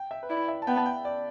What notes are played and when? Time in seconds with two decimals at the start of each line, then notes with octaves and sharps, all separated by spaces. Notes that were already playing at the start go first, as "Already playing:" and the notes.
Already playing: G5
0.11 E5
0.23 B4
0.30 E4 D5
0.48 E5
0.62 A5
0.67 B3 G5
0.77 A5
0.86 G5
1.05 D5